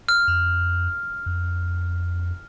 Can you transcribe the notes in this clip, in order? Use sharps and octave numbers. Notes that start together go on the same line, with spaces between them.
F6
F2
F2